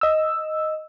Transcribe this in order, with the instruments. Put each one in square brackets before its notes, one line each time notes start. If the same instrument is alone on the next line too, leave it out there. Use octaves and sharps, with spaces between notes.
[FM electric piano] D#5 E6